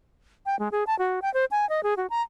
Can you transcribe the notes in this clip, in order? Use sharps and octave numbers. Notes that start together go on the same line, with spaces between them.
G5
G#3
G#4
A5
F#4
G5
C5
G#5
D#5
G#4
F#4
A#5